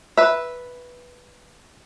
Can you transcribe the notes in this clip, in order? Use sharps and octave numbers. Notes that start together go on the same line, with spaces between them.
B4 E5